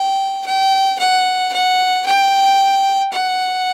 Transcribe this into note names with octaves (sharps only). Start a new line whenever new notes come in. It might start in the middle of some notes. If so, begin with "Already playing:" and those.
Already playing: G5
G5
F#5
F#5
G5
F#5